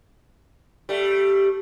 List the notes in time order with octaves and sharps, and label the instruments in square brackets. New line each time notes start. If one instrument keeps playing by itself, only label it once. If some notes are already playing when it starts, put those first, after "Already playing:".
[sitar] G3 A3